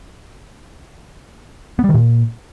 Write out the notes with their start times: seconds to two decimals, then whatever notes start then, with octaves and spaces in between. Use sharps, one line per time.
1.79 B3
1.84 G3
1.89 D#3
1.94 A#2